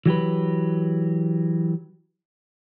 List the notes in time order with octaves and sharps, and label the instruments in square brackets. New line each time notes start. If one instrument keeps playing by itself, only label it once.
[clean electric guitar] E3 F#3 G4 B4